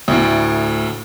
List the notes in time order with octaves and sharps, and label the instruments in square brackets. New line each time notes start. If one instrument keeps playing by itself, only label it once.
[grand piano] D2 A2